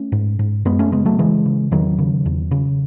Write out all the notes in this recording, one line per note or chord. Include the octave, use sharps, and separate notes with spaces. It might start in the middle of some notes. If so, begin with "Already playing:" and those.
Already playing: A3 C#4
G#2
G#2
F#2 G#3 B3
A3 C#4
C#3 G#3 B3
F#3 A3
C#3 E3 G#3
C#3
E2 D#3 F#3
C#3
E2
C#3